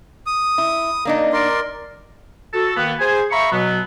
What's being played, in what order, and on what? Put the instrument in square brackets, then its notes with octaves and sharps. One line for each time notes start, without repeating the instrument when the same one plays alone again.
[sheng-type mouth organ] D#6
[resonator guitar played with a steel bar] E4
A#3 D4 D#4
[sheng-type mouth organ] A#4 D5 C6
[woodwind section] F#4 A4
D#3 A#3 B3
G#4 C5 G#5
E5 F5 A#5 B5 C#6
B2 F#3 B3